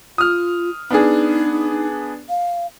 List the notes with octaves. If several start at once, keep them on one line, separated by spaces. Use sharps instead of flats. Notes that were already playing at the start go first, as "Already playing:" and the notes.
F4 D#6 F6
B3 D4 D#4 G#4
F5